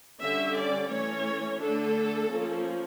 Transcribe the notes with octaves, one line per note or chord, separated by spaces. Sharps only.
D3 G3 C#4 E5
D5
E3 A3 C#4 C#5
D3 A3 D4 A4
F3 A#3 C#4